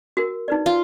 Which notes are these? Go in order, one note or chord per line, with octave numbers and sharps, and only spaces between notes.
F#4 A#4
D#4 B4 D5
F4